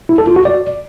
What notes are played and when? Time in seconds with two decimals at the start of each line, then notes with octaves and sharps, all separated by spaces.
0.09 E4
0.18 A4
0.27 F4
0.36 F#4
0.45 D5